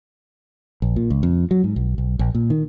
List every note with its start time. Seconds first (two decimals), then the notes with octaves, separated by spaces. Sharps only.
0.82 A#1
0.96 A#2
1.10 C#2
1.23 F2
1.51 F#3
1.64 G#2
1.76 B1
1.98 B1
2.19 A#1
2.35 A#2
2.50 D#3